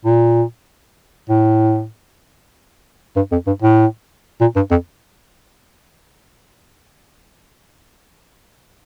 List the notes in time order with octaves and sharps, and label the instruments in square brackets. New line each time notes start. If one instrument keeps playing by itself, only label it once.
[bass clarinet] A#2
A2
G2
F2
G2
A2
A#2
G2
F2